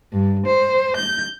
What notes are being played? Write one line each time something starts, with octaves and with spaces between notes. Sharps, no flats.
G2
C5
G6